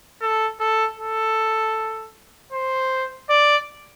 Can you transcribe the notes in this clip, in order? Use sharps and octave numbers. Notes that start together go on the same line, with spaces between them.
A4
A4
A4
C5
D5